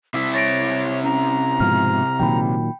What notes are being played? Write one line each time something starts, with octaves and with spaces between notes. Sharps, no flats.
C3 E4 E5
C#5 A6 A#6 D7
C#4 A#5
G#2 B2 F3 F6
A#2 D#3 F#3 G5 B5